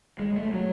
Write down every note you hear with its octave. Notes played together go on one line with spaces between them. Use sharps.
G#3
A3
F#3